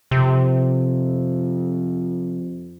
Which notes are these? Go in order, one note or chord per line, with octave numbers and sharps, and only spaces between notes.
F2 C3